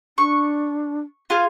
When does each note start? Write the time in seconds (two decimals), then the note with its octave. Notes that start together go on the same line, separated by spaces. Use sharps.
0.18 D4 C#6
1.30 F4 G#4 F5